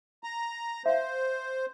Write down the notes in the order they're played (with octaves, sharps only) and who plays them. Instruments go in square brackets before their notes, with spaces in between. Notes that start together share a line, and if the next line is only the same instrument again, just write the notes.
[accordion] A#5
[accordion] C5 [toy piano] E5 F5